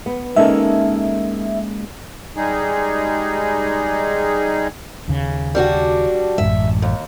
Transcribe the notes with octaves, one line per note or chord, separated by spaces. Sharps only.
B3
G#3 A#3 C#4 D#4 A4 A#4 E5
G3 G#3 D#4 G#4
D#2 C#3
G3 D4 F#4
A1 F#2 G#3 E5
D#2